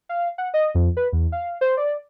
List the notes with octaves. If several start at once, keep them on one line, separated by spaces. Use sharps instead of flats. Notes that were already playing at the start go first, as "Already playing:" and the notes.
F5
F#5
D#5
F2
B4
E2
F5
C5
D5